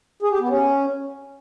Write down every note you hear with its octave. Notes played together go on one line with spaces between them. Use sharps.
G#4
G4
B3
C#4